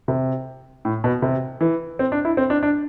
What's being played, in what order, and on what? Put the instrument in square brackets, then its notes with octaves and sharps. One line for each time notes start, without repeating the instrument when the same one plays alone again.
[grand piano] C3
A2
B2
C3
E3
C4
D4
E4
C4
D4
D4